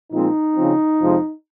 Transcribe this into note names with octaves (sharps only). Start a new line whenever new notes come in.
A#2 F3 G#3 C4 D#4
C#3 F3 C4
F2 C3 F3 G#3